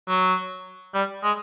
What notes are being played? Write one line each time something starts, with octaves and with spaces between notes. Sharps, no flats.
F#3
G3
G#3